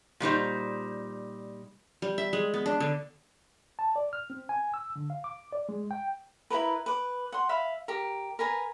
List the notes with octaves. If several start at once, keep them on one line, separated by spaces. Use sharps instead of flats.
A#2 G3 D#4 C5
G3
E5
G#3
B3
D4
D3
A5
D5
F6
C4
G#5
E6
D3
F5
D6
D5
G#3
G5
E4 G4 A#4 B4
B4 D6
F#5 C6
E5 F5 B5
G4 A#4
A#4 B4 G#5 A#5